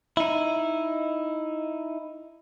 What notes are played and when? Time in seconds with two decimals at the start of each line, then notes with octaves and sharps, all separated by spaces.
0.17 D#4 E4